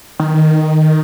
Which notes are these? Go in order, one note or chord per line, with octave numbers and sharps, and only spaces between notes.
D#3